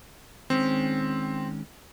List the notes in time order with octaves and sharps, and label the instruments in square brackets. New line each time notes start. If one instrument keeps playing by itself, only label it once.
[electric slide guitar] D#3 G#3 C#4 [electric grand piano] C4